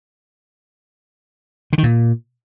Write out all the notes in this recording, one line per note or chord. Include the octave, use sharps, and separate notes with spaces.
D3
D#3
A#2